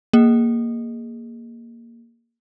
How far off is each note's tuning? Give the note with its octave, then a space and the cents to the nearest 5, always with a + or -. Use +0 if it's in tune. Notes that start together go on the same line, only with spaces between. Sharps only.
A#3 +0 G#4 +0 D#5 +0